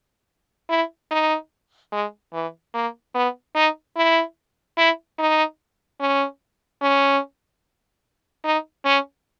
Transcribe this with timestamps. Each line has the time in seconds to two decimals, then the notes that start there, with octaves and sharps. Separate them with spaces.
0.70 E4
1.11 D#4
1.92 G#3
2.33 E3
2.74 A#3
3.15 B3
3.55 D#4
3.96 E4
4.77 E4
5.19 D#4
6.00 C#4
6.82 C#4
8.44 D#4
8.85 C#4